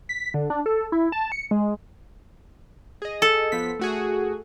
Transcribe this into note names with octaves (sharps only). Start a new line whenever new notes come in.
B6
D3
D4
A4
E4
A5
C#7
G#3
G#4 D#5
A4
F3 B3 B6
A3 F#4 G#4